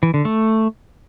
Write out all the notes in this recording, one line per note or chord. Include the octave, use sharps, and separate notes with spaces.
E3
D3
A3